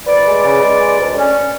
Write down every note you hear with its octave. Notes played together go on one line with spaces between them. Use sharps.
D2 B4 D5
G#3
C#3
G#3
G#3
D2
C#4